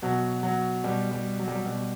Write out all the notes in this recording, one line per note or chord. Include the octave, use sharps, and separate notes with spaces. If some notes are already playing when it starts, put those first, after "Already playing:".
B2 F#3
F#3
B2 G3
G3
F#3
G3
F#3
B2 G3